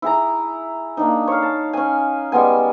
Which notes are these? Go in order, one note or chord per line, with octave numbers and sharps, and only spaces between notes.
E4 G#4 A#5
A#3 D4 D#4
C#5 F5
A5
C#4 G#5
G3 G#3 B3 G#5